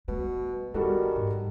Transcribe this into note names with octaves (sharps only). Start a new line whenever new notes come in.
B2 G3 A3
D#3 G3 B3 F#4 A4
G#2